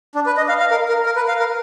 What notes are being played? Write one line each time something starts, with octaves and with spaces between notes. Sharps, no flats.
D4
B4
D#5
F5
F5
A#4
A#4
A#4
B4
F5
A#4